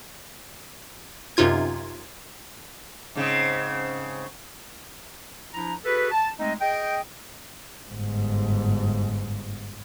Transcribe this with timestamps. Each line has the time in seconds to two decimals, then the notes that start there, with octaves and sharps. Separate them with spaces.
1.37 F#2 C3 D#4 F4 G#6
3.15 G#2 C#3 C4
5.54 F3 D4 E4 A#5
5.85 F#4 G#4 A4 B4
6.12 A5
6.38 G#3 A3 C4 D#4 D#5
6.60 G#4 D#5 G5
7.90 G1 G#2